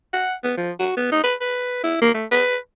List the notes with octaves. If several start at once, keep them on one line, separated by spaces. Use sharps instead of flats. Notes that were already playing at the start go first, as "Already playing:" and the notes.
F#5
B3
F3
F#4
B3
D#4
B4
B4
E4
A#3
A3
B4